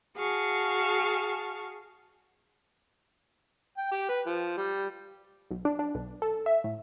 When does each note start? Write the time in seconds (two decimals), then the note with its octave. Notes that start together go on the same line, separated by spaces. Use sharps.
0.15 F#4 G#4 F5 A5 C#6
3.77 G5
3.91 G4
4.09 B4
4.27 F3
4.57 G3
5.51 B1
5.65 D4
5.79 D4
5.95 B1
6.22 A4
6.46 E5
6.64 A2